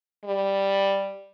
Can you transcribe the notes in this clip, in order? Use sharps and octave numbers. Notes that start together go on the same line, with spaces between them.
G3